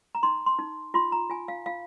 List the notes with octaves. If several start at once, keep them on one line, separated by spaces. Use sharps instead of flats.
A#5
D#4 C6
C6
D#4
F4 C6
A#5
F4 G#5
F5
F4 F5